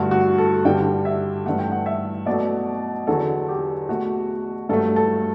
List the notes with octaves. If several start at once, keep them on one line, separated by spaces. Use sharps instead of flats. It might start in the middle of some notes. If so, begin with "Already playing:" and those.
Already playing: G2 D3 A3 F#4
F#4
A4
G2 D3 G3 G5
E5
G2 E3 A3 F#5
G5
F#5
E5
B2 F#3 A3 D5
E2 D3 F#3 A4
G4
B2 A3 F#4
G2 F#3 A3 A4
A4